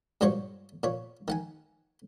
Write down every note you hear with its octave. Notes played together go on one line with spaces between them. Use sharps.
G2 A#2 F#3 C5 C#5 C#6
A#2 C#5
D#3 F#5 G#5